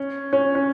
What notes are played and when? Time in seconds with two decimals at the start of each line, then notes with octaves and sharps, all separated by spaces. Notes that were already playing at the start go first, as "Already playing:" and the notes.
Already playing: C#4
0.33 C#4
0.55 C#4